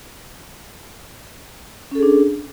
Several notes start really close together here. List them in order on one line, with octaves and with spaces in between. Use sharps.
C#4 A4 G#4 D4